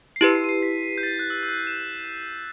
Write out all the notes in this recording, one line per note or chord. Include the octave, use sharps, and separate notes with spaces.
C7
E4 G4 B4 D#7
C7
D#7
C7
B6
G6
A6
F#6
E6
E6
F#6
E7